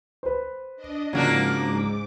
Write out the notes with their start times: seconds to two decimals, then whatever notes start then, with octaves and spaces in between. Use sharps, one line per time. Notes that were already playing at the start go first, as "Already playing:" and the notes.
0.23 B4 C5
0.76 D4 D#5
1.13 G#2 C#3 F3 F#3 A#3 D4 D6